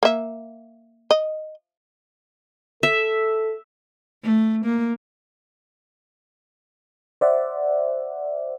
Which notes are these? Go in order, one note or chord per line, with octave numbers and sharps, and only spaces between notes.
A#3 E5
D#5
A4 E5
A3
A#3
C5 D5 E5 F#5